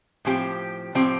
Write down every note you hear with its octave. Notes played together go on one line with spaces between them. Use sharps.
A2 F3 C4 G4
A2 F3 C4 G4